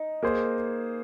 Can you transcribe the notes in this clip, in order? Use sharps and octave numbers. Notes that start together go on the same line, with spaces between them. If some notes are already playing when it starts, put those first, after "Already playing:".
Already playing: D#4
A#3 G#4 C5